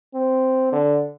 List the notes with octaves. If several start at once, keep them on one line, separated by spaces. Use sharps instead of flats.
C4
D3